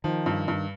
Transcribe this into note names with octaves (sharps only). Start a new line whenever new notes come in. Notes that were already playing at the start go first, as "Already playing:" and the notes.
D#3 F3
G2
G2